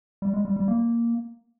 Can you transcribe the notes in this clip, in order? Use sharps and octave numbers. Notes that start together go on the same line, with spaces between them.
G3
G#3
G3
G3
A#3